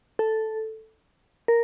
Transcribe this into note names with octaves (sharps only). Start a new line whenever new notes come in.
A4
A#4